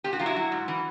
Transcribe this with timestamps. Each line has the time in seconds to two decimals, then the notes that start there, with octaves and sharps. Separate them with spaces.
0.04 A#2 G4
0.13 F#4
0.19 F#3 F4
0.26 E4 F#4
0.36 F#3
0.52 G#2
0.68 E3